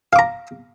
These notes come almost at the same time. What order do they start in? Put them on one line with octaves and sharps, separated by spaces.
F5 D6 A#5